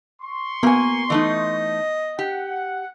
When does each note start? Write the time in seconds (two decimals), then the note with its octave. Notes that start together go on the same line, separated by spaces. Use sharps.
0.22 C6 C#6
0.63 A#3 B3 G#5
1.10 E3 A3 D#4 D#5
2.19 G4 F#5